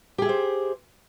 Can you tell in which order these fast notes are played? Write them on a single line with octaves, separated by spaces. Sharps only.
G4 G#4 E5 C5